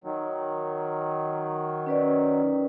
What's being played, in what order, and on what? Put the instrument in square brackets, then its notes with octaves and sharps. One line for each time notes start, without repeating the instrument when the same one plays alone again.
[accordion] D#3 F#3
[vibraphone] C#4 B4 D5